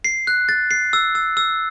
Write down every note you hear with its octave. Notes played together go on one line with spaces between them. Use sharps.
C7
F#6
A6
C7
E6
E6
E6